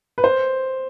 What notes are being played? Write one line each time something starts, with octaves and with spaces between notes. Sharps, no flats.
B4
C5